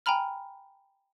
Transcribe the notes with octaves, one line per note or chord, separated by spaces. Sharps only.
G5 G#5 A#5 B5 F6